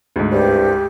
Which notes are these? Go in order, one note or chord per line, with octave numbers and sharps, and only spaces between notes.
D2 G#2
C2 G2 G4